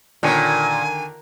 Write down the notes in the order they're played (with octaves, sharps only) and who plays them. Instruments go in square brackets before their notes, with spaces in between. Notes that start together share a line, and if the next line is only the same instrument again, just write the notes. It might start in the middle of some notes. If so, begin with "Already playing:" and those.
[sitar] A#2 [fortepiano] D3 D#3 C#5 [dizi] G#5